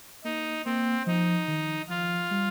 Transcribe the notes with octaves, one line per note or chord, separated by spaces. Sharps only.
A#3 D#4
A#3 C4
F3 D#4
D#3
F3 F4
G3